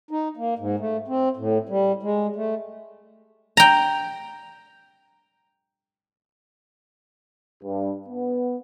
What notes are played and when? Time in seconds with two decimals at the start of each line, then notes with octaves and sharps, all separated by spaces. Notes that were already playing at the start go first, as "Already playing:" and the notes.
0.11 D#4
0.37 A#3
0.59 G#2
0.79 A3
1.08 C4
1.37 A2
1.69 G3
2.03 G#3
2.36 A3
3.57 G5 A#5
7.63 G2
8.07 B3